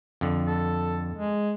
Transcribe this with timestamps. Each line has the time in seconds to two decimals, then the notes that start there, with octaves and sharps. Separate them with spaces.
0.21 F2 D3
0.47 A4
1.17 G#3